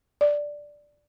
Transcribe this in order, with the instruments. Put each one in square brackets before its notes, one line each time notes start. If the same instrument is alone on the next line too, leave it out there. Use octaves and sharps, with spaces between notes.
[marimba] D5